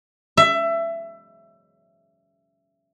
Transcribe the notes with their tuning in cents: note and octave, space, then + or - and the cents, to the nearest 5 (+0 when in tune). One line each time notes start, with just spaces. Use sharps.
E5 +20